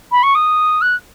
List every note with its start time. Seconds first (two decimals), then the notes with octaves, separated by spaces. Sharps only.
0.11 B5
0.23 C#6
0.35 D#6
0.81 F#6